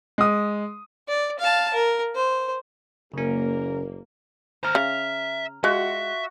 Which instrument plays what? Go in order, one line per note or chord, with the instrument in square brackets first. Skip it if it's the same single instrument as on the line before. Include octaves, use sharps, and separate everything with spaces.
[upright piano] G#3 D#6
[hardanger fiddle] D5
F5 A5
A#4
C5
[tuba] F#1 [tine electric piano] C#3 C#4 [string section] A#3 [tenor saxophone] A#4
[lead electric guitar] D#2 C5 [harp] A#5 F6
[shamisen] C#3 [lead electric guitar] E5
[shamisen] G#3 [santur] F4 F#4 F#5 [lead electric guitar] E5